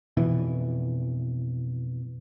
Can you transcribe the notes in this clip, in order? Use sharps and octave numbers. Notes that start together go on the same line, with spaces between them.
F2 B2 E3